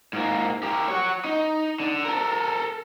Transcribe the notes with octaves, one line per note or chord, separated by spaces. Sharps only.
G#2 A#3
G4 A#4
C#5 F#5
D#4
D3
A4 A#4